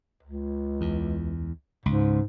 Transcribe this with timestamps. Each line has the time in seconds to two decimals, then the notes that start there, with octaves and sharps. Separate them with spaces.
0.23 C#2
0.81 E2
1.86 C#2 G#2